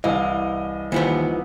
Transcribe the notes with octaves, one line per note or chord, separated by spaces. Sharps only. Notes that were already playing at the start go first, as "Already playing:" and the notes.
C2 E3 D#5 F5
D#2 E3 F3 B3